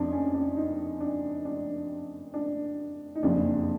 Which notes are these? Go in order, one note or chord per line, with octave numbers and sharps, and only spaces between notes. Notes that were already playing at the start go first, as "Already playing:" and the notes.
Already playing: F2 C3 F3 D4 D#4
C#4
D4
D#4
D4
D4
D4
D#4
F#1 F2 C3 F3 D4